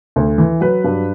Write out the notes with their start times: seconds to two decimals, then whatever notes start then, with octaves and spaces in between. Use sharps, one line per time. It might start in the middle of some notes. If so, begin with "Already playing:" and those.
0.16 D2
0.38 E3
0.61 F#3 B4
0.84 G2